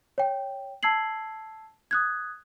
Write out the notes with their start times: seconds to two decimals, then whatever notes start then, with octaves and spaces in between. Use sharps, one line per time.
0.18 C#5 G5
0.83 A5 E6 G#6 C7 F#7
1.91 D#6 F#6 G#6